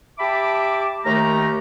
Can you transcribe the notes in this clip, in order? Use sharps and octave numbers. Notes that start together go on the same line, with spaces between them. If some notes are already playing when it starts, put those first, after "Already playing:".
G4 E5 A5 B5 D6
D#2 D#3 A3 G4 A#5